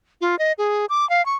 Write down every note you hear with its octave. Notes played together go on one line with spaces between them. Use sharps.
F4
D#5
G#4
D6
F5
C#6